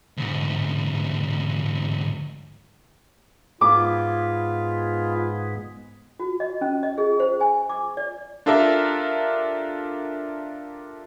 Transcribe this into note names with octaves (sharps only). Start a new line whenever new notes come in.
D2 G#2
G#2 G#3 B3 F4 D6
F#4
D#5
C#4
D#5
G#4
C5
G#5
D6
D5
D4 F4 G4 A4 A#4 E5